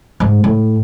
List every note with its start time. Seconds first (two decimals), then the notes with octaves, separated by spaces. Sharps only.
0.20 G#2
0.44 A2